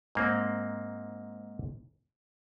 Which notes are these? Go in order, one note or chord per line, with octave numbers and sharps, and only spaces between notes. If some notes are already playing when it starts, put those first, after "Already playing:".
G#2 A#3 C4